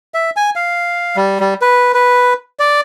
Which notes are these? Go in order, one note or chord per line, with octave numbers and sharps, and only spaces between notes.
E5
G#5
F5
G3
G3
B4
B4
D5